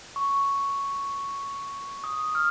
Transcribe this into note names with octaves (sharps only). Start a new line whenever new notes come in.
C#6
D#6
F6